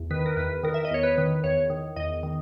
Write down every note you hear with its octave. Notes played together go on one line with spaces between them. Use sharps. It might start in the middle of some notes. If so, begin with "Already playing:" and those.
Already playing: E2
D#3 B4
A#4
E2 B4
D#3 A#4
E5
D#5
E2 C#5
B4
D#3
E2 C#5
D#3
E2 D#5
D#3